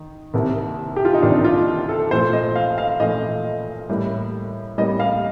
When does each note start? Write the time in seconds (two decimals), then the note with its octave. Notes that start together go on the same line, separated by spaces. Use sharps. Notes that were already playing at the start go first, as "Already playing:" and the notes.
Already playing: D#3
0.34 C2 C3 D#3 A#3
0.96 G4
1.05 F4
1.14 D#4
1.22 C2 C3 D#3 A#3 D4
1.44 F4
1.89 A4
2.11 A#2 F3 A3 C5
2.33 D#5
2.55 F5
2.78 F5
3.00 A#2 F3 A3 D#5
3.89 A2 G3 A#3
4.78 A2 G3 A#3 D#5
5.00 F5